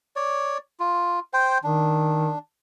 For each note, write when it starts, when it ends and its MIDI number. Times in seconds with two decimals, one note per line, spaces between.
0.16 0.58 73
0.16 0.58 74
0.80 1.20 65
1.34 1.58 72
1.34 1.58 79
1.64 2.33 51
1.64 2.39 62